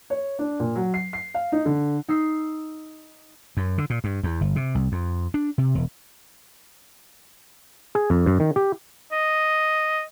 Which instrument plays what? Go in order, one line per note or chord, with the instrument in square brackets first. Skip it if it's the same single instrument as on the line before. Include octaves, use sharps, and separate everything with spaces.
[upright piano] C#5
D4
A#2
F#3
C7
C7
F5
D#4
D3
[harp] D#4 E6 C7
[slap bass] F#2
D3
A#2
G2
E2
G1
C3
C2
F2
D4
C3
E1
[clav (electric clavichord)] G#4
F2
F#2
D#3
G4
[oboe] D#5